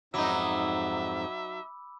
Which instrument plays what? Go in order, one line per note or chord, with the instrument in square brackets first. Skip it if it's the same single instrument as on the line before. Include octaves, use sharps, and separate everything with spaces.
[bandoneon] F2 G#2 [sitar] F#3 D#4 [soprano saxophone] E5 [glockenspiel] B5 D6 E6